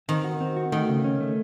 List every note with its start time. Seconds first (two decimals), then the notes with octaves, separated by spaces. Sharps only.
0.09 D#3 C4
0.24 F#4
0.40 C4
0.56 F#4
0.72 D#3 A3
0.89 C#3
1.04 C#4
1.20 A3